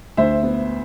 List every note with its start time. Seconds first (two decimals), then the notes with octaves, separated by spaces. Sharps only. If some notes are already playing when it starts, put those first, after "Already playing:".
0.17 D2 C5 E5
0.43 B3